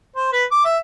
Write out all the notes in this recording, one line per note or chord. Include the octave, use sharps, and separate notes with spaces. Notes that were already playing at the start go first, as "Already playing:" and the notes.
C5
B4
D6
E5